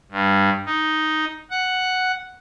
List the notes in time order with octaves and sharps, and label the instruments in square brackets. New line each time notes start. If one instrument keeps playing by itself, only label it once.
[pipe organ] G2
D#4
F#5